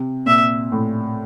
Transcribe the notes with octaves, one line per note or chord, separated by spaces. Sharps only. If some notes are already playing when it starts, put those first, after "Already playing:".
Already playing: C3
A#2 E5
A2